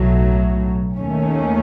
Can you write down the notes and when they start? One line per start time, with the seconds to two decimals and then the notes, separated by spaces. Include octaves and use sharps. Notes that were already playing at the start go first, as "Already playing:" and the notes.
Already playing: B1 A2 F#3
0.98 D#2 D#3 A3 C#4